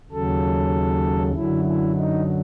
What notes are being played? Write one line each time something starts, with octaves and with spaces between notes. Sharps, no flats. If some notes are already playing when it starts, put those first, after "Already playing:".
D#2 C#3 F#3 A4
F#2 D3 F#3 E4
E4
D#4